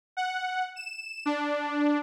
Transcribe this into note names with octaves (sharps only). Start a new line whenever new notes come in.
F#5
E7
D4